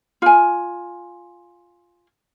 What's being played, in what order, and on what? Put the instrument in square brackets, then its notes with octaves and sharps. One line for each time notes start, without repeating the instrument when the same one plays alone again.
[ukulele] F4 G#5